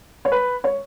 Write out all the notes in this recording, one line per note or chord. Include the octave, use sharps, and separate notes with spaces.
C#5
B4
C#5